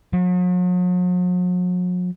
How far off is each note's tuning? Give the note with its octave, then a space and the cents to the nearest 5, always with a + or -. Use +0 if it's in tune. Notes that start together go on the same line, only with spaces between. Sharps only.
F#3 -45